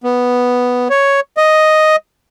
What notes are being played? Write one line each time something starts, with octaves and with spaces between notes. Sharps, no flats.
B3
C#5
D#5